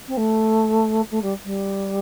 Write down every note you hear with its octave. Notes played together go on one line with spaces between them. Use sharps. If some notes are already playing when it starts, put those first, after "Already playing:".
C4
A3
A3
G3
G3